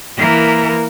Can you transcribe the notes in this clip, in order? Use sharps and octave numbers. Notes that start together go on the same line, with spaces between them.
E3 A#3 A#4